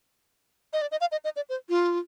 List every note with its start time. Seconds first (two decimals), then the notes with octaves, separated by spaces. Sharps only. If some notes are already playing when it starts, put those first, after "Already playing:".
0.73 D#5
0.82 D5
0.91 D#5
1.01 F5
1.12 D#5
1.25 D#5
1.36 D5
1.49 C5
1.69 F4